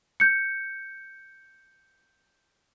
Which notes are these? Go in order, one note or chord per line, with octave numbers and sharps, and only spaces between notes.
G6 C#7